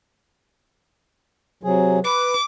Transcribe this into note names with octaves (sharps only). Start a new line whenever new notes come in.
C3 F#3 G#4
B4 D6